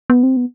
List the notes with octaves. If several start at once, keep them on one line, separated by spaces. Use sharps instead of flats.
B3
C4
B3